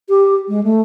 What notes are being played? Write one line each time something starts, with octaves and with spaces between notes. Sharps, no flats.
G4
G#3
A3